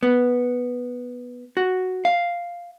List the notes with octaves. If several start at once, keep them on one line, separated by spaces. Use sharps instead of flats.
B3
F#4
F5